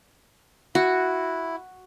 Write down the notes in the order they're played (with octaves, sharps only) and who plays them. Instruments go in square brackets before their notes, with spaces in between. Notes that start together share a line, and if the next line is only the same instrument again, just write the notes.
[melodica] E4 [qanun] F#4